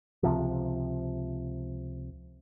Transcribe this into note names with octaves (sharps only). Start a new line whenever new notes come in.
C#2 C3 F3